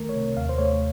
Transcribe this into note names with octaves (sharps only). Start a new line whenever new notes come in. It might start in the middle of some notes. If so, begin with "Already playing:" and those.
Already playing: C2 D#3 A3 A#4
C#5
C3
D#2 F5
C5
A3 C#5